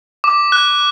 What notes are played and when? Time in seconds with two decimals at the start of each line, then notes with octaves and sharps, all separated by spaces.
0.24 D6
0.52 F#6